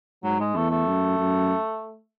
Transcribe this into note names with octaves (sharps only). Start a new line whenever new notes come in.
G#2 F#3
G#3
E2 A3
A3
F#2
F#2